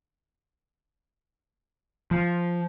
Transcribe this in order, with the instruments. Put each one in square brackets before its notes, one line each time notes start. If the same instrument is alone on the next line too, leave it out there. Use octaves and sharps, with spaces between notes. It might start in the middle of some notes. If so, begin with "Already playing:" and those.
[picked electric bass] F3